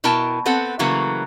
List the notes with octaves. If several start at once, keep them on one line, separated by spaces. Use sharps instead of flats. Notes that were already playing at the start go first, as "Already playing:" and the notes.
B2 E4 A#4 G5 A5
B3 C4 A4 F#5
C#3 E3 F#3 A3 A#3